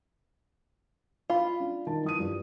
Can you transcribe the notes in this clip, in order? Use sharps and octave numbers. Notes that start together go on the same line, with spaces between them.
F4 F5 B5
D4
D#3 A5
E3 D#6 D#7
G2 F3